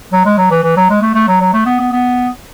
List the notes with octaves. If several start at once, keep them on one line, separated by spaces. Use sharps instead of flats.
F#3
G#3
F#3
E3
E3
F#3
G#3
A3
A3
F#3
F#3
A3
B3
B3
B3